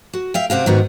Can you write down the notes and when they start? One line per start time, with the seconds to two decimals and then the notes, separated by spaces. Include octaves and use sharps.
0.13 F#4
0.34 E5 F5 G5
0.50 C3 C4 F#4 F5
0.66 G#2 D#3 B3 F#4